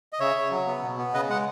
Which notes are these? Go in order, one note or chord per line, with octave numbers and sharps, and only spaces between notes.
D#5
C#3 C#5 E5
C#3
F#3
B3
B2
B3
C#3 B4 D#5
G#3 F#5